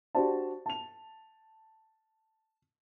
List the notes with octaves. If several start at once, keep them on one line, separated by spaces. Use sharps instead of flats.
D4 F#4 G4 C5 D5 A5
A5 F7